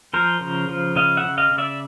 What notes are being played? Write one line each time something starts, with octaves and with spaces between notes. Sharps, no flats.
F3 A#4 C5
C#3
F3
C#3 D#5 F5
E5 F#5
C#3
D#5 F5
C#3
D5 E5